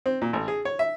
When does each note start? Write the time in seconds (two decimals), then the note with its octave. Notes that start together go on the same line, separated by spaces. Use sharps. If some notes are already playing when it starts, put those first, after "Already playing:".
0.06 C4
0.22 A#2
0.33 A1
0.48 G#4
0.65 C#5
0.79 E5